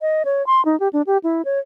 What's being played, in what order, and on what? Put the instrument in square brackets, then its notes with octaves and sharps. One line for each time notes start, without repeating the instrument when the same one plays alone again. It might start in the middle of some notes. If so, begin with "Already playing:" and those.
[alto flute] D#5
C#5
C6
D#4
G4
D4
G4
E4
C#5